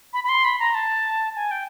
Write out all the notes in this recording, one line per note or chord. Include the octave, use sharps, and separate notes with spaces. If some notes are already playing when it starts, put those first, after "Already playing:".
B5
B5
C6
B5
A#5
A5
G#5
G5